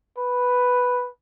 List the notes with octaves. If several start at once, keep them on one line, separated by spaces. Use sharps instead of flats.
B4